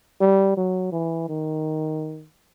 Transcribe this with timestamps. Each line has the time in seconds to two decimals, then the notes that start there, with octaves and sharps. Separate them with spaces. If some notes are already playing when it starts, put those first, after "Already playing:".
0.21 G3
0.57 F#3
0.92 E3
1.29 D#3